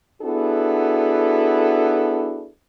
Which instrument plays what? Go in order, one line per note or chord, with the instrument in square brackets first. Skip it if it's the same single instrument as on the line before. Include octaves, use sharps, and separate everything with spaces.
[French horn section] B3 D4 E4 F#4 G#4 A4